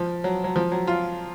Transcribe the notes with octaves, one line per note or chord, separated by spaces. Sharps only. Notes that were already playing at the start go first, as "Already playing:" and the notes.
Already playing: F3
F#3
F#3
F3
F#3
F4